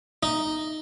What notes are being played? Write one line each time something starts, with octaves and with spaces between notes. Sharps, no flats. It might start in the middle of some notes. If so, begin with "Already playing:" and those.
D#4